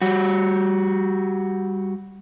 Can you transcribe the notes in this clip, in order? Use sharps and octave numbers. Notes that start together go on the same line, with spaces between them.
G3 F#4